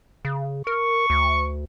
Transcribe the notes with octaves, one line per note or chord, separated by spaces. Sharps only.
C#3
A#4 C#6
D2